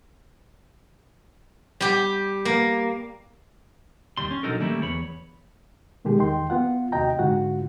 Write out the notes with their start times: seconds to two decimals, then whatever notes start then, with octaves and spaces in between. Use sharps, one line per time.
1.81 G3 G4
2.45 A#3
4.17 D#2 G3 C6
4.31 C#4
4.43 B1 F#3 D4 D#4 A4 A#4
4.60 D#3 G3 A3 A#3 C#4 E4
4.82 E2 C#5 B5
6.05 B2 D#3 G#3 G4 G#4
6.19 E2 D#3 G5 C6
6.50 B3 F4 F#5
6.92 D#2 C3 F#4 D#5 G5 A#5
7.19 G#2 D3 F4 F#4 F#5